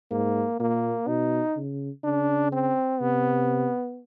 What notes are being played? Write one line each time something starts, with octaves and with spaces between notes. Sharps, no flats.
G#2 A#3
A#2 A#3
B2 D#4
C#3
C#3 D4
C4
C3 B3